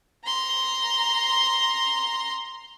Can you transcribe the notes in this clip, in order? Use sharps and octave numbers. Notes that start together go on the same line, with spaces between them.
A#5 C6